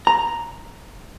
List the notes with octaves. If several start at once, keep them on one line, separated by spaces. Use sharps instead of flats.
A#5